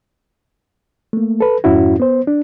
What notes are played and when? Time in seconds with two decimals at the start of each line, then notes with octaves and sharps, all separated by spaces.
1.13 A3 A#3
1.41 A4 B4
1.64 F2 G#2 C#4 E4 F#4
2.00 B3 C5
2.27 D4